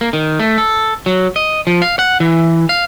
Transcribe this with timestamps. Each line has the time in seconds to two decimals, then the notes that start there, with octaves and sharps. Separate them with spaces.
0.01 A#3
0.13 D#3
0.39 A3
0.58 A4
1.06 F#3
1.36 D#5
1.67 F3
1.82 F5
1.99 F#5
2.20 E3
2.69 F5